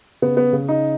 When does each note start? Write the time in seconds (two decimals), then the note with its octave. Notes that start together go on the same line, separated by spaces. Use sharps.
0.22 C#3 B3
0.37 B3
0.53 C#3
0.69 D#4